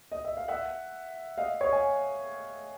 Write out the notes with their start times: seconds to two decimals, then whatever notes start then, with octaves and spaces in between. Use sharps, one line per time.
0.12 D#5
0.25 E5
0.37 F5
0.48 E5 F#5
1.38 D#5 F5
1.61 C#5 D#5
1.73 G#5